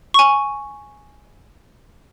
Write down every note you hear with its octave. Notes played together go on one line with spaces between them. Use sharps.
G#5 C#6